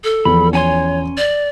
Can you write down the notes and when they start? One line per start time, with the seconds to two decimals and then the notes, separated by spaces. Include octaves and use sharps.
0.04 A4
0.25 E2 F3 B5
0.53 C#4 C#5 G#5 C6
1.17 D5